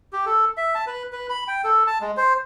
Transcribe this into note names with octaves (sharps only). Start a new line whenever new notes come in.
G4
A4
E5
A5
B4
B4
B5
G5
A4
A5
G#3
C5